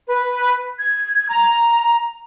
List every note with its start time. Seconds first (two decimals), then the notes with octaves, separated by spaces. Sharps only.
0.07 B4
0.78 G#6
1.29 A#5